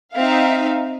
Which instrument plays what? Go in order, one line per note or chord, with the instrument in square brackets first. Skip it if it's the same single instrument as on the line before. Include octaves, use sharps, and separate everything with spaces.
[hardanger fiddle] C4 [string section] D#4 E5 F5